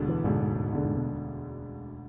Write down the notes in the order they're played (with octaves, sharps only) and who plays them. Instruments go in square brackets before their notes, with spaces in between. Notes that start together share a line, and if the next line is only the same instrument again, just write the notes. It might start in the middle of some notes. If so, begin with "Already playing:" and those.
Already playing: [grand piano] E1 D2 D3 G#3 D4
[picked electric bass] E3
[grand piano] E1 D2 D3 G#3 D4 [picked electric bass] G#2
[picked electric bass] G#2
G#2
[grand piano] E1 D2 D3 G#3 D4
[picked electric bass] G#2
B2